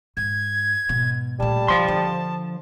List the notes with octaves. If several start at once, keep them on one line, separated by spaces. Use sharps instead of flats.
G#2 G#6
G#2 B2
A#2 G3 A3 A5
C#3 F3 C6
D3